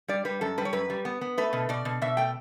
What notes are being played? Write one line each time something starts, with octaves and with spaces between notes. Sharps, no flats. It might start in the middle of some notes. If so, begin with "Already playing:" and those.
G3 D5
G3 B4
F#2 A4
G3 B4
C#5
F#2 B4
G3
B3
B3
A3 B4
B2
B2 D5
B2
B2 E5
A3 G5